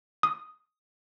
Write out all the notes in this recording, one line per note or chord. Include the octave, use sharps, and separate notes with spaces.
D#6